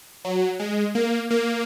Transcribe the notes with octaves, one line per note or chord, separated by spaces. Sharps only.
F#3
G#3
A#3
A#3